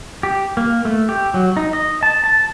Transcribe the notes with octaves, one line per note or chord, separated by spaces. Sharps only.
G4
A#3
A3
G4
F#3
D#4
D#5
A5
A5